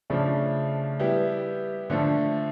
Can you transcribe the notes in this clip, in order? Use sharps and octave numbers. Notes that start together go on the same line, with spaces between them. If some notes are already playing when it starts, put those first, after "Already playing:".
C#3 F3 A3 D4
G3 B3 E4 G4
D3 F3 A3